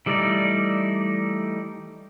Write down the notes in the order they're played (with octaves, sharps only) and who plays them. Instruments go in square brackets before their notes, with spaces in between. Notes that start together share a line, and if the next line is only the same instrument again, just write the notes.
[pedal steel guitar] E3 G3 A3 D#4 D5